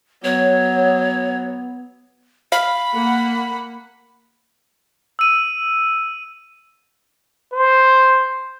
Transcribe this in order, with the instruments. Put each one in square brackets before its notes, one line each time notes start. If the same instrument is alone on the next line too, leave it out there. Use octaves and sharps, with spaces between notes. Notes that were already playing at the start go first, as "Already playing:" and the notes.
[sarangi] F#3 [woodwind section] B3 [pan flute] C#5
[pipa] F5 [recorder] B5
[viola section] A#3 F#5
[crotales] E6 D#7
[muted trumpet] C5